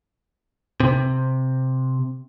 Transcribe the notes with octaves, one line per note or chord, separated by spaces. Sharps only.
C3